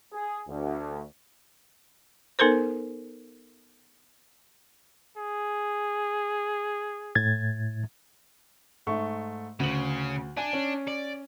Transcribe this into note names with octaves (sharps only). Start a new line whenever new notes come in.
G#4
D2
B3 D#4 A4 A#4 C5
G#4
A2 G#6 A6
G#2 A3 C#6
D2 C#3 F#7
D4 G#5 D#7
C#4
D5